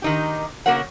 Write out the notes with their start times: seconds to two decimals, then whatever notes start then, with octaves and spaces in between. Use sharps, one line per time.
0.02 D#3 D#4 G4
0.66 C#3 A#3 F#4 A#4 C#5 F#5